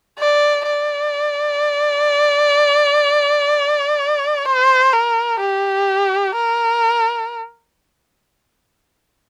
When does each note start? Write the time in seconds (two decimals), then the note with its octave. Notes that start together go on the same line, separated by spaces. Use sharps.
0.19 D5
0.67 D5
4.46 C5
4.93 A#4
5.40 G4
6.35 A#4